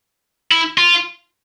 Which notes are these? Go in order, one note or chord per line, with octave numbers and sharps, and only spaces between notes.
E4
F4